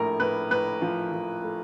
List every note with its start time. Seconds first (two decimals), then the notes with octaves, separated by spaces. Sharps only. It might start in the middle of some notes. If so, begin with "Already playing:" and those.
Already playing: A#1 A2 A#4
0.20 A2 B4
0.51 A2 B4
0.82 F3
1.12 F3
1.43 A3